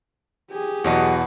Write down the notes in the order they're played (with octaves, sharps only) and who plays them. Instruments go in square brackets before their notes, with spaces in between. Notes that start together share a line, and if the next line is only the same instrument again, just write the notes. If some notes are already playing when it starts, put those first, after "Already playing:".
[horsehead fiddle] G4 G#4
[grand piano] E2 B2 [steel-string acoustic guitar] G2 F#3 D#5 [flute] F#5